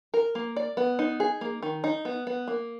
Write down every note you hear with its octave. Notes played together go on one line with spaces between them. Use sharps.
A#4
A#3
D5
B3
D#4
G#4
A#3
D#3
D#4
B3
B3
A#3